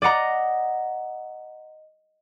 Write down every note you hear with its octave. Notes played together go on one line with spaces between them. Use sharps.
D5 D#5 F#5 A#5